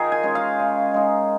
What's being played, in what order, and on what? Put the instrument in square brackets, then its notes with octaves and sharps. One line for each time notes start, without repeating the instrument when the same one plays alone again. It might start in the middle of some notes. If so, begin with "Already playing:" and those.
Already playing: [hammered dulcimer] D#3 D#4 F4 G#4 A#4
G#5
G#3 C#4
F5
C#3
G#3 D#4